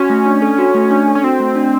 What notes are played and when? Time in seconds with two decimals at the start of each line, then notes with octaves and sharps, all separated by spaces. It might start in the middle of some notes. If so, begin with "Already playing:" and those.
Already playing: C#4 F#4
0.10 A3
0.26 D4
0.42 A4
0.58 F#4
0.75 A3
0.91 D4
1.08 A4
1.15 C#4
1.24 C4 F#4
1.40 A3
1.55 D4